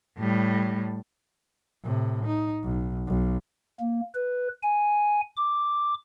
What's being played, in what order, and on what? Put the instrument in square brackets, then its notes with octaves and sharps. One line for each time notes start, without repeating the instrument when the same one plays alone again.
[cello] A2 G3
[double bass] A2 C3
D#4
B1
B1
[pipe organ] A#3
B4
G#5
D6